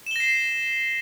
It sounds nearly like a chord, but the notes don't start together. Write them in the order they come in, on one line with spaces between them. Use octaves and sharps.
E7 G7 A#6 C7